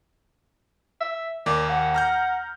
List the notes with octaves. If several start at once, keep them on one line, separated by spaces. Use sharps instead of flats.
E5
D#2 A#3 D5
F#5
A#5 F6 G6